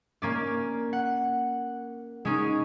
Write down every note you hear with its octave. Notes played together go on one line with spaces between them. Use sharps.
A#3 C#4 D5
F#5
G#3 C#4 D#4